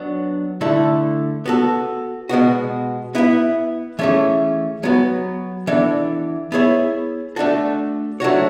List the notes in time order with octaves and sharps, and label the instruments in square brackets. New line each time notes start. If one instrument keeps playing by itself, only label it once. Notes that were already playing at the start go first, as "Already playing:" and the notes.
Already playing: [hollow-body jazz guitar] F#3 B3 D4
D3 A3 E4 A4
B3 F#4 A4
B2 G#3 B3 F#4
B3 E4 B4 E5
E3 A3 C#4 G#4
F#3 B3 F#4
E3 B3 D4 A4
B3 E4 G#4 C#5 E5
A3 D4 F#4 A4
F#3 A3 D4 F#4 C#5